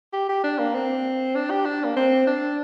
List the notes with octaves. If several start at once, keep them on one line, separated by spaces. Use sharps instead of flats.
G4
G4
D4
A#3
C4
D4
G4
D4
A#3
C4
D4